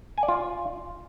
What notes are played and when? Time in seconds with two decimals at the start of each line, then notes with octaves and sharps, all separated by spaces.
0.18 G#5
0.23 D5
0.28 F4